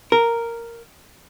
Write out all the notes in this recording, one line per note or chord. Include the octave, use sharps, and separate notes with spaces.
A#4